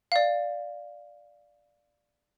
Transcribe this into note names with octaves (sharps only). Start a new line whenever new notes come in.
D5 F5